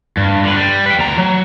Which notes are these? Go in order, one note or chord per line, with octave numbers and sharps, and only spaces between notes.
G2
D3 B4
G3
B4 G5
D2 A#5
F#3